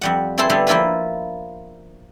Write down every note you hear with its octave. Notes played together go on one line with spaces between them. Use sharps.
F2 G3 F#5
C4 E4 G#4 A4 C5
D3 G3 B3 D4 C5
F3 A#3 E4 F4 B4